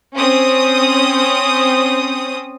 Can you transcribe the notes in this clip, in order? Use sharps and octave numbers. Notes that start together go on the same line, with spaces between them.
C4 C#4 D#6